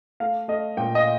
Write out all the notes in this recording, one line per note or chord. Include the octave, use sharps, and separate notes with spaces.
A3 F5
A3 D#5
A#2 G5
D#5